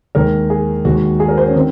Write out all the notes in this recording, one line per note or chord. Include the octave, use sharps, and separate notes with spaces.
D#2 D#3 G#3 A#4
G#4
D#2 D#3 G#3 F#4
G#4
A#4
C5
C#4
D#3 C4